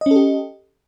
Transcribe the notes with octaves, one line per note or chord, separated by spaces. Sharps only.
C#4 G4 A4 D#5